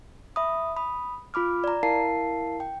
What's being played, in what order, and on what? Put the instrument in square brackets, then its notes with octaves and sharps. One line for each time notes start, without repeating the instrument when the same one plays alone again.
[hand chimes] E5 B5 D#6
B5 D#6
F4 B5 D6 F6
D5 A#5
E4 A#4 F5 A5 C7
G5